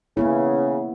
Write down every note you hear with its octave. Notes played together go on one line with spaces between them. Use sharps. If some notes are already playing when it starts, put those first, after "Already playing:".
C#3 A#3 B3 E4